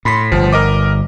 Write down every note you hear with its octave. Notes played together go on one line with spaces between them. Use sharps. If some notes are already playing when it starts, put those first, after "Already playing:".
A2 B5 C6 B6
G1 F3
A#4 D#5 D6